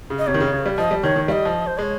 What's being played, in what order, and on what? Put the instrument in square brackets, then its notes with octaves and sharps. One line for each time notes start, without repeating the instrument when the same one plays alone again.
[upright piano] C#3
[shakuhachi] D#5
[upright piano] C3 [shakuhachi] C#5
[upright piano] D#3
C#3
C#3
G3
[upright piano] F3 [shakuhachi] D#5
[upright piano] G3
[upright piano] D#3 [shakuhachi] C#5
[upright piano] D#3
[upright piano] G3 [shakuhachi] F5
[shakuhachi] D#5
[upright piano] F3
[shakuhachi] C5
[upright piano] G#3 [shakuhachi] C#5 D#5